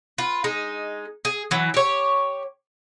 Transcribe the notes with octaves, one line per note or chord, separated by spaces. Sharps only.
F4 B4
G#3 D#4
G#4
E3 F#3
G4 C#5